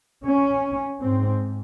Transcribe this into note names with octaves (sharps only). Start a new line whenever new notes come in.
C#4
G#2 C4